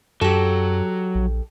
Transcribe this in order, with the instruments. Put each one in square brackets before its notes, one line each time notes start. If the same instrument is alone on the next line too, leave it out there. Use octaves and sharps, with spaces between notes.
[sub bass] F#2 [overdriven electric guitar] F#3 [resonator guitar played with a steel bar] G4 A4
[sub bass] A#1